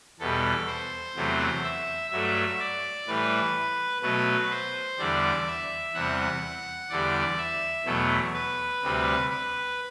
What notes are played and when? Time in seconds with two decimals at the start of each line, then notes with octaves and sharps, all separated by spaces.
0.20 E2 B2 G3 A4
0.67 C5
1.16 E2 C3 F#3 A3
1.63 E5
2.10 G2 F#3 A3 E5
2.59 D5
3.07 A2 E3 G3 B4
4.02 B2 F#3 A3 B4
4.51 C5
4.98 E2 D3 G3 D5
5.47 E5
5.94 E2 C3 G3 F#5
6.89 E2 D3 G3 D5
7.38 E5
7.85 E2 B2 F#3 A3
8.34 B4
8.82 D2 C3 G3
9.30 B4